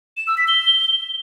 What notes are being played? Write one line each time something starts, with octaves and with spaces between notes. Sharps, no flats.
E7
E6
B6
G7